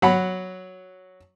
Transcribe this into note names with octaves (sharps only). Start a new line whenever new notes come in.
F#3 F#5 B5